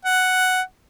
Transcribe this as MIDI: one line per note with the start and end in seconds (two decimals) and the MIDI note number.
0.05 0.61 78